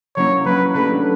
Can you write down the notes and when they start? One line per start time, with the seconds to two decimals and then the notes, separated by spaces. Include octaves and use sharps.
0.16 F#3 A#3 C#4 E4 C#5
0.45 F#3 A#3 C#4 E4 B4
0.74 F#3 A3 D4 G4 B4